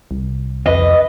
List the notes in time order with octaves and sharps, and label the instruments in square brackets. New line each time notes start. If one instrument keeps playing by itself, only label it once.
[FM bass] C2
[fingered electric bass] F2 [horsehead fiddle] B4 [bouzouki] D#5